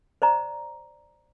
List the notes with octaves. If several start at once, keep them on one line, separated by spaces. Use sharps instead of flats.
C5 D5 A#5